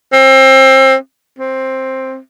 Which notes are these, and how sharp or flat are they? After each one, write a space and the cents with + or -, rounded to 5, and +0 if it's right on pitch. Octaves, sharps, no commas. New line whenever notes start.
C4 +30
C4 +10